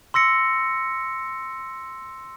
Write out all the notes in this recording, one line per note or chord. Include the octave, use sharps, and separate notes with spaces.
C6 E6 A#6 C#7